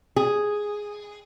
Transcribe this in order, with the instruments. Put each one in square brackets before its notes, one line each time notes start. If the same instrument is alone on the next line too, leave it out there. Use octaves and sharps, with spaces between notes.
[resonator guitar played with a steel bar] G#4